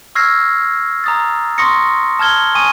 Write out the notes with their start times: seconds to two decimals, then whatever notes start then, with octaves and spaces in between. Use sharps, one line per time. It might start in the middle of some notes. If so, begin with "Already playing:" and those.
0.15 C#6 E6 F6 G#6 A#6 C7
1.04 A#5 D#6 A6
1.58 C6 C#6 D#6 A#6 C#7
2.19 A5 F6 G#6 G7
2.55 G#5 C#6 D#6 D#7